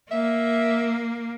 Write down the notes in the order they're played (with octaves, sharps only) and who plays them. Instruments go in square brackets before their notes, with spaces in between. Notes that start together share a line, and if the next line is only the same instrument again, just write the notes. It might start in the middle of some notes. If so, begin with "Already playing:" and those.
[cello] A#3 [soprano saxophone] E5